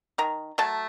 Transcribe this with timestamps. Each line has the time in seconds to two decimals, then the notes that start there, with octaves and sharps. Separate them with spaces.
0.18 D#3 A#5
0.58 F#3 A3 A5